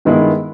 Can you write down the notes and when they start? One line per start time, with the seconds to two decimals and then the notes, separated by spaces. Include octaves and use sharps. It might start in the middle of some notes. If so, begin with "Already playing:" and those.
0.05 G2 D#3 G#3 B3 E4